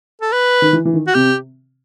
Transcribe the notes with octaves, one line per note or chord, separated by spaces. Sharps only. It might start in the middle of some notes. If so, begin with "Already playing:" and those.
A4
B4
D#3
E3
E3
D#3
F#4
C3 G4